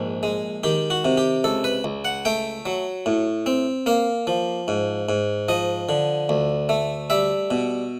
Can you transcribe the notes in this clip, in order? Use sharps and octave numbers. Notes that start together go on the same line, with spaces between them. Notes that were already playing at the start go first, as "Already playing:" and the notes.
Already playing: A#1 G#2
G#3
D#3 G4
F#4
C3
G4
C#2 A4
B4
C#2
F#5
A3 G5
F#3
A2
C4
A#3 F5
F3
G#2
G#2
F3 D#5
D3
D2
A3
G3 E5
B2